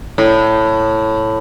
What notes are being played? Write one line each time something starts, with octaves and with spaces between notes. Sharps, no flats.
A2